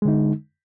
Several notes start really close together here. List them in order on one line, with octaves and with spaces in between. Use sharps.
G#3 D3 D#4